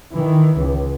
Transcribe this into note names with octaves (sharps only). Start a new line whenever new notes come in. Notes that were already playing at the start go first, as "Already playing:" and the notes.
D#3 E3
C#2